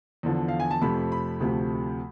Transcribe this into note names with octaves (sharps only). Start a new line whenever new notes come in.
E2 D3 F3
F5
G#5
A5
F2 C3 F3 A3 B5
B5
D2 C3 F3 A3